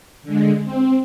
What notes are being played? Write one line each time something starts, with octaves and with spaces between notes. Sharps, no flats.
D3 G#3
C4